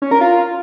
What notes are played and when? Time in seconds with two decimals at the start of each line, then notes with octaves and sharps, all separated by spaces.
0.02 C#4
0.11 A#4
0.21 F4